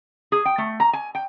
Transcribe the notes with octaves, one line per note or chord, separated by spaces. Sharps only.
G#4
G5
A3
A#5
G#5
G5